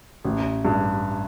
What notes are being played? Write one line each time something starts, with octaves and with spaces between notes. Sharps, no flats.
A1
G2